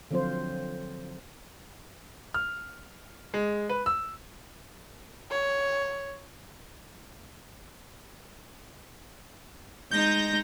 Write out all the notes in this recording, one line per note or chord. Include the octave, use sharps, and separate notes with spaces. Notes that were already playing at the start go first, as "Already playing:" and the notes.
D3 F3 F#3 C4 F4 C5
F6
G#3
B4
E6
C#5
G#3 D#4 G6 A#6